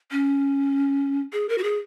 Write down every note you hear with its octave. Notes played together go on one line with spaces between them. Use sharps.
C#4
G#4
A#4
F#4
G#4